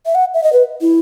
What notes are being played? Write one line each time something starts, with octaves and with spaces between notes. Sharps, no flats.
E5
F#5
E5
D#5
B4
E4